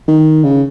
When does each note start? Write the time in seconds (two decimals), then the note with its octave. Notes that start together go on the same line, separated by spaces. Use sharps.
0.08 D#3
0.44 C#3